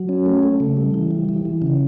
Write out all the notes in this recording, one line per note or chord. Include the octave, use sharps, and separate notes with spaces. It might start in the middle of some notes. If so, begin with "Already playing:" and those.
Already playing: F#3
C#4
A3
A3
C#3
G3
E3
G3
E3
E3
C#3